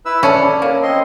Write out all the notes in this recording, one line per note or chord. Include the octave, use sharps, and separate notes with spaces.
E4 B4 E6
C#4 E4 A4 D5 B5
A#3
C4 D#5 C6